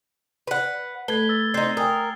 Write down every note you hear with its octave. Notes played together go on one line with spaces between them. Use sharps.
B4 F#5
A3 A4 B4 G#6 G7
E6 A6
C4 D#4 C7
A#4 G5 G#5 D#6